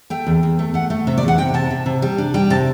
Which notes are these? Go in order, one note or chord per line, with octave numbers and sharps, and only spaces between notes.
A3 G5
E2
E2
A3
A3 F#5
A3
C3 E5
D5
E2 F#5
C3 G5
C3 A5
C3
C3
G3
D4
G3 G5
C3 A5